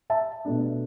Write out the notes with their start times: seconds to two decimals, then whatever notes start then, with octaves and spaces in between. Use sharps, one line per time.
0.10 E5 A5
0.45 B2 A3 D4